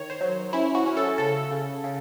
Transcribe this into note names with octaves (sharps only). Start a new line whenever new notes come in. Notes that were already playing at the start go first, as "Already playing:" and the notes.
Already playing: D#3 C#5
C5
F#3
C#4 E4
F#4
C#4
A4
C#3 A4
C#3
C#3